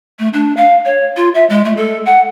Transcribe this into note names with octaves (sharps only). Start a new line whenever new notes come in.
A3
D4
F5
C#5
F4
E5
G#3
A3
A4
F#5